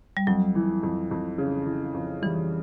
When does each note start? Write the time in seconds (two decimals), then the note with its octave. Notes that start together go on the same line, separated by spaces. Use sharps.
0.17 G3
0.27 F2 F#3
0.55 E3
0.83 F2
1.11 F2
1.38 C#3
1.66 E3
1.94 F2
2.22 E3 G3